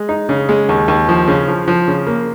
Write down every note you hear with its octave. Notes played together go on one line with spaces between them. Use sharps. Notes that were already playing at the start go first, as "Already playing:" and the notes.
Already playing: G#3
D#4
C#3
G#3
D#2
D#2
F3
C#3
F3
F3
C#3
A#3